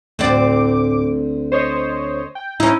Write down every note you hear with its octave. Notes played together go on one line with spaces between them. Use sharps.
D2 A2 C4 D5 D6
C5 C#5 D#5
G5
C#4 D#4 E4